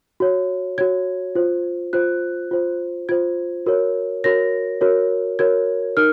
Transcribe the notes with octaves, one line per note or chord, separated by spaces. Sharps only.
F#4 C#5
F#4 C#5 G#6
F4 C5
F4 C5 F#6
F4 C5
F4 C5 G#6
F#4 A#4 C#5
F#4 A#4 C#5 A#6
F#4 A#4 C#5
F#4 A#4 C#5 G#6
D#4 A#4 F6